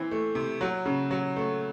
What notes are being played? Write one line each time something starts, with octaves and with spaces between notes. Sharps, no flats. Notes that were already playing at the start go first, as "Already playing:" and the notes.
Already playing: E3 C4
A3
C3
F#3
C#3
F#3
A3